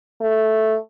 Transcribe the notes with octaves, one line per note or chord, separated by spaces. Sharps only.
A3